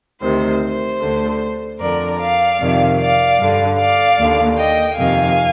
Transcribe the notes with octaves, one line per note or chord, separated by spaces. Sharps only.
D2 C3 D#3 C5
C5
D2 D3
F2 D3 A#4 D5
D5 F5
F2 C3 D#3
D5 F5
G2 D3
D5 F5
D#2 D3
D#5 G5
F2 C3 D#3 F5 G#5